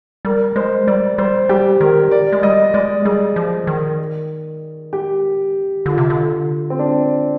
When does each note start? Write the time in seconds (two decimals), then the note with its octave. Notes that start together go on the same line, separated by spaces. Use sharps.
0.25 G3 A#4
0.56 G#3 C5
0.87 G3 D5
1.18 G3 C5
1.49 G3 G4
1.81 D#3 A#4
2.11 D5
2.32 G#3
2.43 G3 D#5
2.74 G#3 D5
3.05 G3 G#4
3.36 F3
3.67 D#3
4.93 G4
5.86 D3 F4
5.98 C3
6.10 D3
6.70 C4
6.79 D4